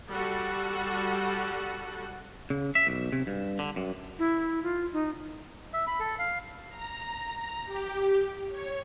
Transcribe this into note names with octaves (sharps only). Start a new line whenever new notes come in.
G3 F#4 A4 F#5
C#3
E5
B1
C3
G2
D3
F#2
E4
F4
D#4
E5
B5
A4
F5
A#5
G4
C#5